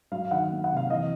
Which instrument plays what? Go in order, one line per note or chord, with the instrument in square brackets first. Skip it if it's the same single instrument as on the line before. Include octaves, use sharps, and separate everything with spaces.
[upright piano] F#3 [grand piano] F5
[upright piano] D#3 [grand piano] F#5
[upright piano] A#3
[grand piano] F#5
[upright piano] C3
[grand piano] F5
[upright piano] E3 [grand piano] D#5